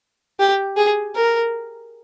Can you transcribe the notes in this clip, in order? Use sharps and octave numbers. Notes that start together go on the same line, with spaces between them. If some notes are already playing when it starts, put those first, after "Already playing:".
G4
G#4
A#4